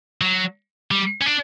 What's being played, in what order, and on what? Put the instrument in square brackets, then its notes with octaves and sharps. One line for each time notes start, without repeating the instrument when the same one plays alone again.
[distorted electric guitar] F#3
G3
C#4
D4